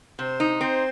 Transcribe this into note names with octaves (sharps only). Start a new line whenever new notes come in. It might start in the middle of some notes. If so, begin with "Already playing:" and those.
C3 C5
D#4
C4 C5